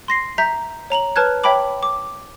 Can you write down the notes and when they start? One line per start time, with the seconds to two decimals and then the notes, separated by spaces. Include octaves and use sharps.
0.08 C6 A#6 C7
0.38 E5 A#5 G6 B6
0.90 C#5 A#5 F7 F#7
1.16 B4 C#5 A5 F6 F#6 G#6
1.44 C#5 E5 G5 A5 B5 D6
1.83 D6